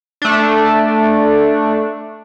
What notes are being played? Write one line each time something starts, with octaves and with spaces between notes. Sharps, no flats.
A3 D4